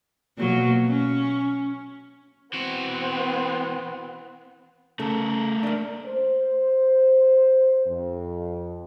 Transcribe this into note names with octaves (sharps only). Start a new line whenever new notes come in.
B2 F#3 A#3
C#4
E3 B3 C4 F#4
C#3 A3 A4 A#4
A#3 D4
C5
F2